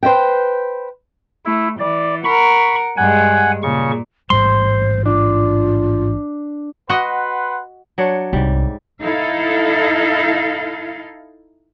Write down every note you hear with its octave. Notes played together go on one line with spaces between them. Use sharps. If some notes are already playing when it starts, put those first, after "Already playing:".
B4 C5 D#5 E5 G5
A3 E4
E3 D5
A#4 F#5 B5 C#6
G2 G#3 F#5 G#5
A#2 C#3 C#6
A1 G#2 G3 C5 C6
D4 F4
F#4 B4 D#5 F#5 C6
F#3 D4 C#5
C2 G#2 G3
D#4 E4 A4 F5